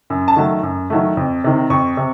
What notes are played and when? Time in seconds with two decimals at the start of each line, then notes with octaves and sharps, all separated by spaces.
0.10 F#2
0.28 A5
0.36 D#3 F#3 A3
0.63 F#2
0.90 D#3 F#3 A3
1.17 F2
1.44 C3 D#3
1.70 F2 C#6
1.97 C3